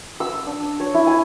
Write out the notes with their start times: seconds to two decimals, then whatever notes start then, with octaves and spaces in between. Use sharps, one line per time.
0.20 E6
0.46 D4
0.80 C#5
0.94 E4
1.07 G#5